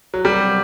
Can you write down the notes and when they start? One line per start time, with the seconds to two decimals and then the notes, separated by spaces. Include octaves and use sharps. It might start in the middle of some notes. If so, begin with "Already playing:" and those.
0.14 F#3
0.24 C3 F#3 G3 A#3 F#4 A#4